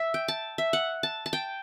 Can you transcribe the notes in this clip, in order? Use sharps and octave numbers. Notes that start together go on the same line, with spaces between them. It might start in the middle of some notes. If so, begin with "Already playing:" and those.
Already playing: E5
G5
A5
E5
F#5
A5
A5
G5